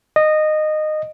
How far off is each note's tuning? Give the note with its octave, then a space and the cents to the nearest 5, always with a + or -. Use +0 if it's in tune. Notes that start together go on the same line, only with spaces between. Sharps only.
D#5 -15